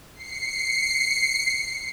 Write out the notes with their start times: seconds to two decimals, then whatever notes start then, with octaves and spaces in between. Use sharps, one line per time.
0.14 C7 C#7